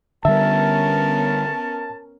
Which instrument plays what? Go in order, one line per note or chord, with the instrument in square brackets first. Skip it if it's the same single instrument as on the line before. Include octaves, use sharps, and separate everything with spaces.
[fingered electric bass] D3 G3 [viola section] B3 C#4 A#4 [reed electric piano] E5 [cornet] A5